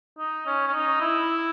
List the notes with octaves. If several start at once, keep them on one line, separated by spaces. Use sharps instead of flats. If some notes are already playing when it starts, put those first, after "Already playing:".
D#4
C#4
C#4
D#4
E4